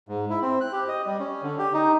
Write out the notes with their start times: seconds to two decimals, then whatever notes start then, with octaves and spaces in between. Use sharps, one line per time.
0.08 G#2
0.30 E4
0.42 C4
0.61 F#6
0.73 G4
0.88 D#5
1.06 G3
1.20 C#4
1.43 D3
1.59 G4
1.74 D#4